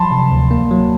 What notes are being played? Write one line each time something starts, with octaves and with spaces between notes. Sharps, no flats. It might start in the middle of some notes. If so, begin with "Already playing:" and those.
Already playing: F3 F#3 A5 B5 C6
C3
D2
A#3
F#3